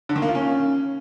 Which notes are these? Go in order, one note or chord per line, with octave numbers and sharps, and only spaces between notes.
D3
D#3
A#3
F4
C#4